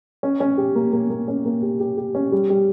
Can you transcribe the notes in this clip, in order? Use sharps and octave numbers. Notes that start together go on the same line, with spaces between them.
C#4
C#4
G4
A#3
A#3
A#3
C#4
A#3
G4
G4
G4
C#4
G3
G3